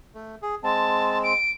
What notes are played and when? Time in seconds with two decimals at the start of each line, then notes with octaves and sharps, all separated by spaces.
0.15 A3
0.42 G#4
0.63 G#3 C4 A5
1.23 D7